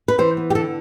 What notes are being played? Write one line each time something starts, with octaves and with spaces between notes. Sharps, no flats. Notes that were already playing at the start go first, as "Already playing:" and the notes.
B4
E3 C5
B3
G4
D3 A4